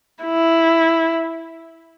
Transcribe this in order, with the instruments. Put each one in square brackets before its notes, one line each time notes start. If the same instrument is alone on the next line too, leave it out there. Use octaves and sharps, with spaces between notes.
[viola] E4